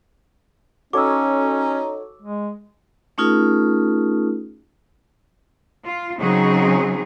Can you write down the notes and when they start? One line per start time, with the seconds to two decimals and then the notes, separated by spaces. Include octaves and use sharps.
0.93 C#4 D#4 F#4 A4 C#5 D6 E6
2.22 G#3
3.18 A3 C#4 D#4 F4 G#4 A#4
5.83 F4
6.18 C#3 F#3 C4 D#4 G#4